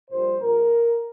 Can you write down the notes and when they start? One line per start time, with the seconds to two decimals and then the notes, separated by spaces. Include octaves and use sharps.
0.10 A#1 A#2 G3 C5
0.41 A#1 A#2 A#4